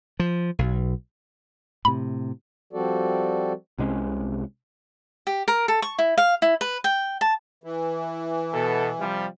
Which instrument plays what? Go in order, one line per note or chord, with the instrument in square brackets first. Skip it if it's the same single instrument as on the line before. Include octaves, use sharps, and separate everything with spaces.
[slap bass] F3
B1
[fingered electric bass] A2 C3 [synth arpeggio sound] B5
[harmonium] F3 G3 C4 F#4 A4 D5
[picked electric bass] C2 C3 G#3 C#4
[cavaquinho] G4
A#4
A4
C#6
E4
F5
E4
B4
G5
A5
[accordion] E3
[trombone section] B2 A4
C3 F3 G3